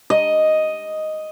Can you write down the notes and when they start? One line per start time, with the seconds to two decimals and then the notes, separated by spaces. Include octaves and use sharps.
0.10 D#5